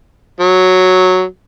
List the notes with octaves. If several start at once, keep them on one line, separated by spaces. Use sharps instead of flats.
F#3